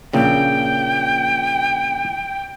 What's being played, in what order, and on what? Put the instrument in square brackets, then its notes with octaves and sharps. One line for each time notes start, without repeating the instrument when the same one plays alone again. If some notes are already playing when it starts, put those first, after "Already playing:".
[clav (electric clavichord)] A#1 A#2 C#3 [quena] G5